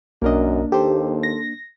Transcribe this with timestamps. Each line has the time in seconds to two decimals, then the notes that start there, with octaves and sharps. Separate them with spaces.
0.22 B1 F#2 A#3 D4 A#4 D#5
0.72 D#2 G4 A4 C5
1.23 A#6